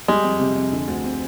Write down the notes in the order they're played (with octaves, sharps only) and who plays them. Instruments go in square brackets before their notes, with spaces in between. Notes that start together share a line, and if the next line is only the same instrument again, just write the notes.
[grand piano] G3 [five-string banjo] G#3
[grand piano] F2
C3
F2
D3
D2
C4